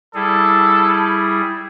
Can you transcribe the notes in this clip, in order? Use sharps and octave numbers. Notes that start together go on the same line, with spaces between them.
G3 E4 G#4 A4